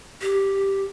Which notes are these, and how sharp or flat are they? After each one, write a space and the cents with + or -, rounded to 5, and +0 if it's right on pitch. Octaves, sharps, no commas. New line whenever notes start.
G4 -5